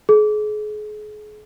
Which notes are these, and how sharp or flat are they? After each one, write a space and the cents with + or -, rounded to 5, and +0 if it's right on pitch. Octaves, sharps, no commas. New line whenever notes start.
G#4 +35